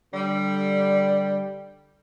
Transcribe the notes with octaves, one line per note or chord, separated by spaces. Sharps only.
D3 G3